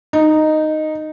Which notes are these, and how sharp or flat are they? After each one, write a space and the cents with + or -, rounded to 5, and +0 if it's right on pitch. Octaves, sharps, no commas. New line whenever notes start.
D#4 -5